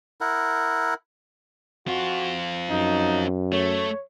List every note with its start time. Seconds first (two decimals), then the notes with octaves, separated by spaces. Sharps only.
0.21 E4 A#4 F#5
1.87 C4 F4 F#4
2.70 F#2 D#4
3.53 A3 C#5